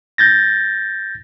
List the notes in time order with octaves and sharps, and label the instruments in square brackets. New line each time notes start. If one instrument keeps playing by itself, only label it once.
[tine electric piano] G6 A6 A#6